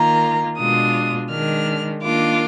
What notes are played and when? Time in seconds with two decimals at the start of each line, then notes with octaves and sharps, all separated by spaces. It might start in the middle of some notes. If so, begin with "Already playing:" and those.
Already playing: D#3 A#3 F4 A#5
0.59 B2 G#3 D4 F4 D#6
1.31 D#3 G#3 D4 F6
2.04 D#3 A#3 D4 F4 D6